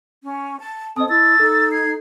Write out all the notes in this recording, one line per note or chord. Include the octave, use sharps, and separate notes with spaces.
C#4
A5
C4 A4 D#5 A5 D#6
E4 E6 A6
D#4 A4
G#6 C7